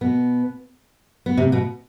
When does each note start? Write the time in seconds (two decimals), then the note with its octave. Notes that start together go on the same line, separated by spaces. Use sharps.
0.01 B2 B3
1.26 B3
1.37 C3 C4
1.52 B2 B3